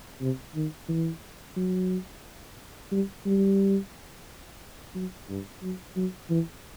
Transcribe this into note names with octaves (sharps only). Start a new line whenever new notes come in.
C3
D#3
E3
F#3
G3
G3
F#3
G2
F#3
F#3
E3